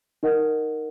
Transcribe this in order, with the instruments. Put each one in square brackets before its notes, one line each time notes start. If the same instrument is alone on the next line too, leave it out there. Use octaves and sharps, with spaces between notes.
[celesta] D#4 A#4 D#5 F#5